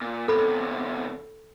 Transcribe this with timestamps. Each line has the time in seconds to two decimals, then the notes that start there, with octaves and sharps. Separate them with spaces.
0.01 A#2
0.28 E2 C3 A4 B5